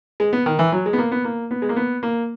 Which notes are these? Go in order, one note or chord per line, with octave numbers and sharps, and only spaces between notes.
G#3
B3
D#3
E3
F#3
G#3
B3
A#3
B3
A#3
B3
G#3
A#3
B3
A#3